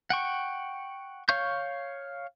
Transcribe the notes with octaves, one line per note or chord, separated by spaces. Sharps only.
F#5 G5 C#6
C#5 F5 C#6 G6